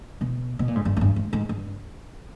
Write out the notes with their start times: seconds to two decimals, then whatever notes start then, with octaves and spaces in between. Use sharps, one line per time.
0.21 B2
0.59 B2
0.68 A#2
0.75 G#2
0.85 G2
0.97 E2
1.01 G2
1.16 G#2
1.33 G#2
1.49 G2